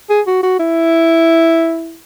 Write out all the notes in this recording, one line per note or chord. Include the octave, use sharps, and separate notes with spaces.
G#4
F#4
F#4
E4